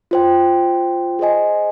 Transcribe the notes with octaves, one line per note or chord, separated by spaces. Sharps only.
F4 C5 G5
G#4 C5 D#5 G#5